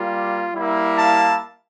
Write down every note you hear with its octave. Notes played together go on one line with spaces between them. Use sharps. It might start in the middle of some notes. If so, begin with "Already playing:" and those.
Already playing: G3 A#3 F4
G3 A#3 E4
F5 A5